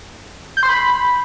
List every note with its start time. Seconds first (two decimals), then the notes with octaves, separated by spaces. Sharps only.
0.57 G6
0.63 C6
0.69 B5